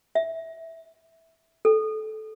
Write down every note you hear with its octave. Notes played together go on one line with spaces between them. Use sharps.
E5
A4